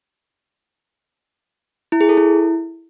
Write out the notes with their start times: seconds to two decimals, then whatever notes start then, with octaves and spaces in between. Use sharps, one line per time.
1.92 E4
2.01 G#4
2.09 A4
2.17 E4